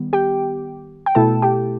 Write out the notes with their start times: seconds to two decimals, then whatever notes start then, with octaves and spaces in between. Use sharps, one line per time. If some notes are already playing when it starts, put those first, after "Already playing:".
Already playing: D#3 G3 B3
0.13 G4 G5
1.06 G5
1.15 B2 A3 E4 A4 A5
1.42 G4 G5